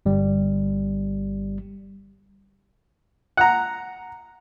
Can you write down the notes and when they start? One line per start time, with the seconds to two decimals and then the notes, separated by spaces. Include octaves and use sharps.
0.06 G1 G3
3.37 F#5 A#5